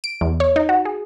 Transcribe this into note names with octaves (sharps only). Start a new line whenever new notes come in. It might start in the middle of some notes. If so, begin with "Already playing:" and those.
D7
E2
C#5
D#4
F#4
G#4